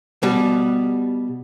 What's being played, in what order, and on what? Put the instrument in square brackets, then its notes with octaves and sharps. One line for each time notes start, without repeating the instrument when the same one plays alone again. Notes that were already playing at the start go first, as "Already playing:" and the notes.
[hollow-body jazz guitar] B2 G3